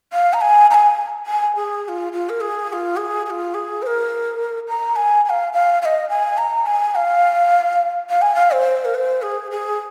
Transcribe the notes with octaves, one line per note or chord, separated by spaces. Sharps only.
F5
A#5
G#5
A#5
G#5
G#5
G#4
G#4
F4
F4
A#4
G#4
G#4
F4
G#4
G#4
F4
G#4
C5
A#4
A#5
G#5
G#5
F5
F5
F5
D#5
G#5
A#5
G#5
F5
F5
G#5
F5
C5
A#4
C5
G#4
G#4